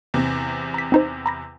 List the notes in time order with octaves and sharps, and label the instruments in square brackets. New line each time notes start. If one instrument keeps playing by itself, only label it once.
[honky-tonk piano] E2 C3
[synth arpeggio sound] A#5 B6
C4 D#4 C5
A#5 B5 A#6